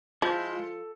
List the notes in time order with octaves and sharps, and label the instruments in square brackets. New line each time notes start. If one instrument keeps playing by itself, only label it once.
[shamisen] F3 [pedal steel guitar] G#3 E4 G6 [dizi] F4
[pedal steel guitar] A4